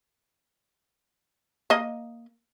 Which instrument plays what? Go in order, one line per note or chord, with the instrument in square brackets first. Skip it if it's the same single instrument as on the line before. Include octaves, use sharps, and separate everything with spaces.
[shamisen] A#3 D#5